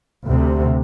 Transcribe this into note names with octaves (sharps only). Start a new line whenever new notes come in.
D2 C3